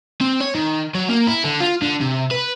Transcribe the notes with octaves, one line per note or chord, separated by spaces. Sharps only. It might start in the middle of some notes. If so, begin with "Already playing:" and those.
C4
C#5
D#3
F#3
A#3
E4
D3
F4
D3
C3
B4